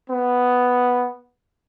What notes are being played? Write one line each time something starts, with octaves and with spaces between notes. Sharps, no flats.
B3